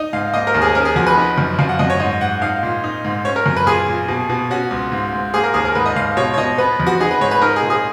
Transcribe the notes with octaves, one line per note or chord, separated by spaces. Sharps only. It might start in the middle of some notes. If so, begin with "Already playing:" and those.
Already playing: D#4 D#5
G#2 F5
A#3 D#5
A#4
D#2
G#4
C#4 A#4
G#4
F2 F#4
B4
D#4
F#2
F#2 F5
F#5
F#2 D#5
C#5
G#2 D#5
G#2 F#5
D#4 F5
A#2
D#4
G#2
C#4 C#5
A#4
F#2
B4
A#2 G#4
A#2
B2
B2
C#4 F#4
C#2
G#2
G#2
A#3 G#4
A#4
D#2 G#4
A#4
G#2 B4
D#5
G#2 F5
B2 C#5
C#5
B2 D#5
B3 B4
F2
F#4
D#4 G#4
B4
G#2 C#5
B4
D#4 A#4
G#4
A#2
G#4